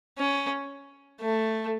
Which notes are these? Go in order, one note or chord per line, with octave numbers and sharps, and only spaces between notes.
C#4
A3